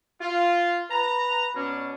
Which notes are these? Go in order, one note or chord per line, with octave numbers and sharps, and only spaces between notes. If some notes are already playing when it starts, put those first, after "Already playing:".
F4
B4 A#5
B2 C#4 D4